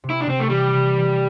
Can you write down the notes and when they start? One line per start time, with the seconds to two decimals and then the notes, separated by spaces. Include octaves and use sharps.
0.04 C3
0.10 E4
0.21 D4
0.27 C3 C4
0.40 A3
0.50 E3 G3
0.73 C3
0.97 E3